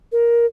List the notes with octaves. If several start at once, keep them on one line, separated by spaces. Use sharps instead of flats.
A#4